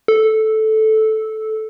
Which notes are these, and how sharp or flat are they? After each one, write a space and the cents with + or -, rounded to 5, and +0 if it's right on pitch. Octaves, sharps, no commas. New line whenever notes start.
A4 -10